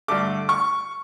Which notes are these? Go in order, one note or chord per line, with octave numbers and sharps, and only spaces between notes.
G2 D3 A3 D6
C#6